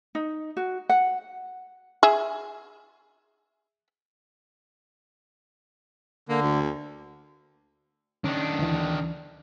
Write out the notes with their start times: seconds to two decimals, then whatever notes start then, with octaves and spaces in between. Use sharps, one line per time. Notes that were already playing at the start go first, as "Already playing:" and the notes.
0.15 D#4
0.57 F#4
0.89 F#5
2.03 G#4 E5
6.29 D3 A#3
6.42 D2
8.24 D#3 C#4 D4
8.59 D2 E3